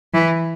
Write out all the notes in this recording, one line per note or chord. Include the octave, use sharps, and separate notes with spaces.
E3